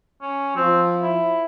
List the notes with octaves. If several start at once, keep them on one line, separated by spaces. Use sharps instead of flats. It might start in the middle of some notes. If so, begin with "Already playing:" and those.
C#4
F3 C4
E4